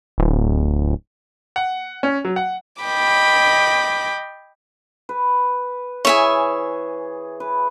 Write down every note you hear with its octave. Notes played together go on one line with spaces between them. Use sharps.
D1
F#5
C#4
F#3
F#5
D#5 G5 B5 D6
B4
E3 G#4 C#5 E5 G#5
B4